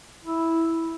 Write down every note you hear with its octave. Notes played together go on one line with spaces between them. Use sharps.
E4